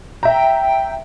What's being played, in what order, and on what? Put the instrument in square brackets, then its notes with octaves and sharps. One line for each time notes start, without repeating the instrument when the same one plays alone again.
[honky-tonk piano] E5 A#5 [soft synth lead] G5